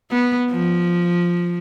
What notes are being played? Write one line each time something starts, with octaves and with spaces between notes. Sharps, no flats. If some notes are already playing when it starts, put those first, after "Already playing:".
B3
F3